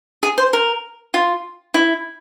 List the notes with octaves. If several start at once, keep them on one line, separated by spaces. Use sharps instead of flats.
G#4
C5
A#4
F4
E4